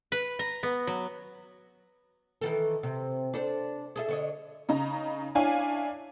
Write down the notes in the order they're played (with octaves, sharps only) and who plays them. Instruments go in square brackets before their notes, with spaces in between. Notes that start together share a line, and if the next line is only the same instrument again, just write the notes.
[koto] B4
A#5
B3
F#3
[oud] D#3 E3 A4
C3
D4 A4 C5
G#4 A4 E5
D3 C#5 D#5
[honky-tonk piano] C#3 D#4 A#5
D4 E4 C#5 F5 G#5